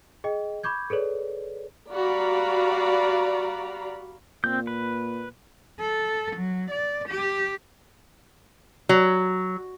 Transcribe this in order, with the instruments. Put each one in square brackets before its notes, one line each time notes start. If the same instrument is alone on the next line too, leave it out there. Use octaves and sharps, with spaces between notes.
[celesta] G#4 D#5 G5
B5 C#6 D6 G6 G#6
G#4 A4 B4 C#5 D5
[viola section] G3 F#4 D5 F5 A#5 B5
[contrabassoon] A#2 [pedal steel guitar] C4 G6
[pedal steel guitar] B4
[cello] A4
F#3
D5
G4
[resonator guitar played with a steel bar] F#3